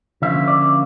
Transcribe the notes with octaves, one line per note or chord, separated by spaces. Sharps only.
D3 F3 A#3 C#4 F4 E5
D5